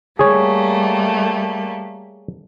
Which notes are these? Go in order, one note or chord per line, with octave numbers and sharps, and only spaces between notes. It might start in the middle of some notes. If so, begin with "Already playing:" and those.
G3 A3 A#3 G#4 C#5